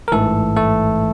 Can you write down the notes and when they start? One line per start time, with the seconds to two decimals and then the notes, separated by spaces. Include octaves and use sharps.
0.08 A#4
0.12 A1 G#2 E3 A3 A4
0.57 A3 A4